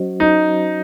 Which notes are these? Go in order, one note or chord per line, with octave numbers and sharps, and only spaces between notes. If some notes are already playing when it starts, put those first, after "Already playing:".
Already playing: F#3 C#4 F#4 C5 D#5
D#4